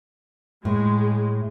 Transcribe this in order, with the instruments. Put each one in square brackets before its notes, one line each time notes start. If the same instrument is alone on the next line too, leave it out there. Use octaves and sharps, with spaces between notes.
[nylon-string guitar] A2 [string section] G#3